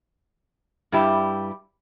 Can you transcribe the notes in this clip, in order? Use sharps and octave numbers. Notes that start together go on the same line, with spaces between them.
G2 G3 E4 G4